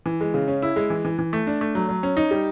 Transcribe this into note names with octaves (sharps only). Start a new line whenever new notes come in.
E3
G#3
C#3
C#4
E4
G#3
E3
E3
E3
A3
D4
A3
F#3
F#3
C#4
D#4
G3